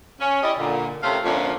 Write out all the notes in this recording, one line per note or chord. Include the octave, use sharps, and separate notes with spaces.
C#4
E4 G4 D5 D#5
A#2 D3
C3 A3 C#4 F4 A#4 F5
F2 A#2 D3 A3 C#4 D4